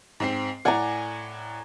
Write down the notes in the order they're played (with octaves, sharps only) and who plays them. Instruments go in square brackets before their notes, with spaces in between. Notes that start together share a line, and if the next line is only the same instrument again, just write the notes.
[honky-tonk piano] G#2 C4 C7
[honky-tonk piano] A2 D5 F#5 [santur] G#5 A#5